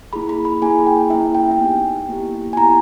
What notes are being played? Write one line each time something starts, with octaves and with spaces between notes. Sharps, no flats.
A#3 E4 G#4 B5
B5
B5
A#3 E4 G#4 G#5
G5
A#3 C#4 E4 E5
G5
G5
B3 D#4 G4 G#5
A#3 E4 G4
G#5
B3 E4 G4 A#5